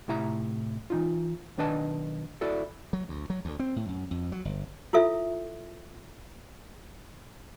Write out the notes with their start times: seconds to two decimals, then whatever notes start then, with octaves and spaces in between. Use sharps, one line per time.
0.08 A2 C3 E4 E5 A#5
0.90 E3 D#4 F4
1.58 B1 D#3 D4 B4 D#5 A5
2.41 E4 F#4 A4 D5
2.93 F#3
3.09 D2
3.30 F#3
3.45 D2
3.59 C4
3.76 A2
3.89 F#2
4.11 F2
4.32 F#3
4.45 G1
4.93 E4 F4 A4 E5